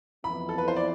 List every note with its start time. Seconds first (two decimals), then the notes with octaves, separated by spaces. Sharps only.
0.24 F2 E3 B3 E4 B5
0.49 A4
0.58 B4
0.68 C5
0.76 D5